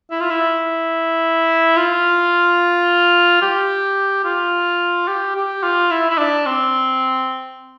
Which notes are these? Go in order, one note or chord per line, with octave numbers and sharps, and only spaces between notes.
E4
F4
E4
F4
G4
F4
G4
G4
F4
E4
E4
D4
C4